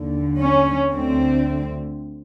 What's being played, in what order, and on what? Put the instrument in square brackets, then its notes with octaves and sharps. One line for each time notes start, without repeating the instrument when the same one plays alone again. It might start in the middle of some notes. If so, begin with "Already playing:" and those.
Already playing: [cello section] D#2 D3
C#4
D2 D3 C4